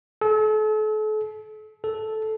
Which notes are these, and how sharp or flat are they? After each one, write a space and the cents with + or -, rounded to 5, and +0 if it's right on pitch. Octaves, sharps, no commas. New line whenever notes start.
A4 -40
A4 -10